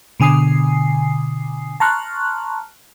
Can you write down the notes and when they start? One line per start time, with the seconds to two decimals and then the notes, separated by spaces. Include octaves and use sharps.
0.20 B2 D3 G#5 D#6 C7
1.80 A5 A#5 C6 C#6 F6 F#6